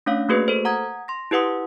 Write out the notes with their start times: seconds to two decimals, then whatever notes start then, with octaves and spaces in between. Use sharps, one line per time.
0.06 A3 C#4 D4 C#5 F5
0.29 A3 A#3 F#4 G#4 B4
0.48 A4 C5
0.65 F#5 A#5 D#6 G#6
1.08 C6 A#6
1.31 E4 G4 B4 F#5 D#6